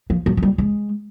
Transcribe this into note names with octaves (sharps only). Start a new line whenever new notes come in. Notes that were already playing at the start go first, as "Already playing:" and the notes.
F3
F#3
F#3
G3
G#3